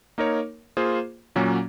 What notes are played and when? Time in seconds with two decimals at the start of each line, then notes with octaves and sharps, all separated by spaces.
0.18 A#3 D#4 A#4 C#5
0.77 A#3 F4 G#4 C5
1.36 A#2 F#3 A#3 C#4 F#4